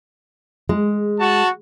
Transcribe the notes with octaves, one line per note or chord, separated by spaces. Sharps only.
G#3
F#4 A5